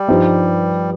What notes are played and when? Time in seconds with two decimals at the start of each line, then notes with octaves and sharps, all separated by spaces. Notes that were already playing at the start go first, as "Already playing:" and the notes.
Already playing: G3
0.08 G2 F3 D#4 G4